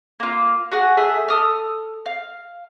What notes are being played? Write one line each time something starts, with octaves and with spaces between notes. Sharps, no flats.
A#3 F4
F#4 G#4 F#5
A3 G#4 E5
A4 D#6 F6
F5